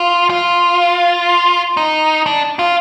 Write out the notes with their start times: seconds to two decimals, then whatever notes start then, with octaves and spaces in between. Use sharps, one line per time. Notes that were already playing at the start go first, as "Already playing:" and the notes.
Already playing: F4
0.30 F4
1.77 D#4
2.26 D4
2.59 F4